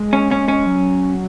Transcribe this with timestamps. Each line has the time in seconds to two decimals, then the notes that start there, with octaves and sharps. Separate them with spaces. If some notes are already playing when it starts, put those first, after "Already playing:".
Already playing: G#3
0.13 C#4
0.31 C#4
0.48 C#4
0.66 F#3